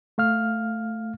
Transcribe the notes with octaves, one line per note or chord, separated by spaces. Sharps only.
A3 F5 F6